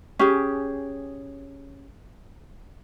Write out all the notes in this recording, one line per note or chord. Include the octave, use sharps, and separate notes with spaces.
C#4 G4 G#4